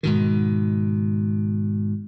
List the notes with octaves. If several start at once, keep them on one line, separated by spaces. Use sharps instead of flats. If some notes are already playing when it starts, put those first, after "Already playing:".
G#2 B2 D#3